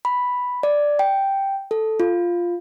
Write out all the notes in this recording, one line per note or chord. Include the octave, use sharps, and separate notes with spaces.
B5
D5
G5
A4
F4